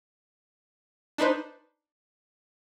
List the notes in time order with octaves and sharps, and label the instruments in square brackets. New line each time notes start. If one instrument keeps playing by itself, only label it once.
[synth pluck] D4 D#4 B4 C5